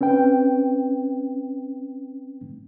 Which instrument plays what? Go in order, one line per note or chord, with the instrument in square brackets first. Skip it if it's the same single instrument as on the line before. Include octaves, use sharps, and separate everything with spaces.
[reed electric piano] C4 C#4 B4 G5